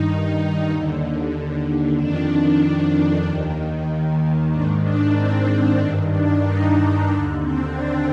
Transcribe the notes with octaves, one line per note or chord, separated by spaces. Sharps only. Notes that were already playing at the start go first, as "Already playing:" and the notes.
Already playing: G2 D#3 D#4
D#2 D3
F2 D#3 D4
D#2 D#3
G#2 D#3 D4
D4
C4
D4
G2 D#3 D4
D4
D#4
D#4
D#2 D3 D4
C4
D4